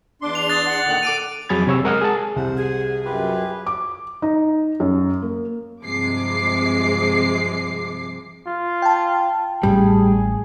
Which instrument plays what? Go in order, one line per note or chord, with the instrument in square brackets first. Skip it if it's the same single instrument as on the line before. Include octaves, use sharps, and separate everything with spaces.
[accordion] E2 D4 C6 [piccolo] D6
[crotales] F7
[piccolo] D#6 [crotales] F#6 A6
[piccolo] F#5
[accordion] A#2 D3 D#3
[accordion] A4 [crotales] D6 D7 D#7
[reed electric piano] F2 F#3 G#4 B5 G#6 A6
C3 C#5 E6
G#3 A#4 F#5 D#6 F6
G#4 A5
[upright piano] C2 [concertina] C5 F#5
[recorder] G#4
[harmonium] F#2 [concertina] F4 G4 B4
[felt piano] D6
D#4
F#2
A#3
[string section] G2 C3 F3 G#3 D6 C7
[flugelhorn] F4
[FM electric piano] G5 A5
[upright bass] A1 [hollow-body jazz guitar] G3 [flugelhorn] G#4